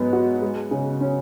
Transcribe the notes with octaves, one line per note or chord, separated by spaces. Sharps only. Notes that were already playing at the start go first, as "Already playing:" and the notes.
Already playing: G#2 F#3 B3
F#4
G#3
C#3
C#4